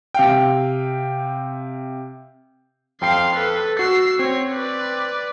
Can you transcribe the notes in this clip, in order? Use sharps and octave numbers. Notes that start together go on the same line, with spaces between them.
C3 F5 G5
F2 F5 G5 C6 C7
A4 B4
F#4 E6 C7
C4 C#5
B4 D5